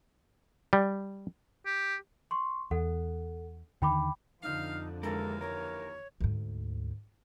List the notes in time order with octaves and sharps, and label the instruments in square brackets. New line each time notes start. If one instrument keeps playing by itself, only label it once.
[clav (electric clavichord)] G3
[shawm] G4
[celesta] C6 C#6
[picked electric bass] E2 [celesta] A4 F#5
[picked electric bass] D#2 D3 D#3 [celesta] G5 B5 D6
[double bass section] F2 D3 F3 [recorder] D#4 [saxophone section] F5
[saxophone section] D#2 E3 F5 [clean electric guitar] G#3 A#4 [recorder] A4
[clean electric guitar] A#4 [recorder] C#5
[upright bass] D2 G#2